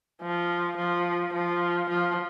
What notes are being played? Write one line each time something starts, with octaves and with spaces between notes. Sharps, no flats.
F3
F3
F3
F3